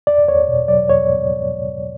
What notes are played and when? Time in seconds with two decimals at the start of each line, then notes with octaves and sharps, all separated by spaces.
0.07 E2 D5
0.28 E2 C#5
0.48 B2
0.68 F#3 D5
0.89 E2 C#5